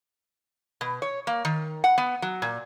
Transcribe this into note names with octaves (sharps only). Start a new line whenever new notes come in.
B2
C#5
A#3
D#3
F#5
B3
F#3
A#2